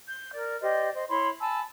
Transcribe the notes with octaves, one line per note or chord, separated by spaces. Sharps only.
G6
A#4 D5
G4 C5 D5 D#5
C5 D#5
E4 C#5 B5 C6
G#5 A5 B5 E6